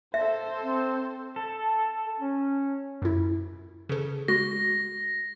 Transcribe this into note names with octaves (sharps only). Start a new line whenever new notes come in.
A4 C5 E5
C4
A4
C#4
F#2 E4
C#3 A4
G#3 F#4 A#6